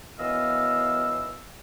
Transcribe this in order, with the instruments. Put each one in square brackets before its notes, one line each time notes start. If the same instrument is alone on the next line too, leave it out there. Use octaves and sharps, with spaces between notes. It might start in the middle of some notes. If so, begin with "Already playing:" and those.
[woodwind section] F#2 E3 B3 D#5 F5 E6